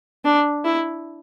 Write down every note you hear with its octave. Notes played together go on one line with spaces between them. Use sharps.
D4
E4